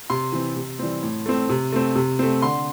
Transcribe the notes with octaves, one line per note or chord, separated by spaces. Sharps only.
C3 C6
E3 C4
C3
E3 G3 C4
A2
A3 C4
C3
A3 C4
C3
A3 C4
D3 C6